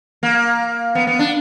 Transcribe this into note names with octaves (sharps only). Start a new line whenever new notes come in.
A#3
B3
B3
D4